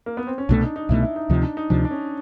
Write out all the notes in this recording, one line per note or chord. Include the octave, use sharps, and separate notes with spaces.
A#3
B3
C4
C#4
C2 B2 F#3 A3 D4
D#4
D#4
C2 B2 F#3 A3 E4
E4
D#4
D2 C3 F3 D#4
D4
D#4
D2 C3 F3 D4
D4
C#4